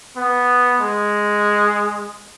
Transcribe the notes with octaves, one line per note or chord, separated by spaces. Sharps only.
B3
G#3